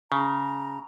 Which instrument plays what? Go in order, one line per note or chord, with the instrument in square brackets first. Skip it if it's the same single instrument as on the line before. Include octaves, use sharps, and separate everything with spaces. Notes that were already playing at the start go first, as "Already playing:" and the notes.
[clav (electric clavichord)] C#3 [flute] A#5